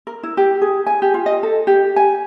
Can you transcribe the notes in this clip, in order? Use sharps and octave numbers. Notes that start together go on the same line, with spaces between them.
A#4
E4
G4
G#4
G#5
G4
F4
D#5
A4
G4
G#5